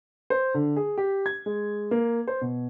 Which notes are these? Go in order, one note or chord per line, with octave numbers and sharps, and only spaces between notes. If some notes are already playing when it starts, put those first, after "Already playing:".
C5
D3
G#4
G4
G#6
G#3
A#3
C5
B2